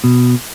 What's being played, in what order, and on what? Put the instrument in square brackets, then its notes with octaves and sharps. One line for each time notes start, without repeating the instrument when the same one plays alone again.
[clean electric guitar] B2